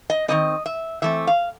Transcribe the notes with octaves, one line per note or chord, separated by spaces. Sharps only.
D#5
D#3 G3 C4 D#5
E5
E3 A3 C4 E5
F5